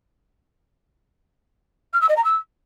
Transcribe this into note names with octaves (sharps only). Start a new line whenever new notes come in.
F6
E6
D#5
A#5
E6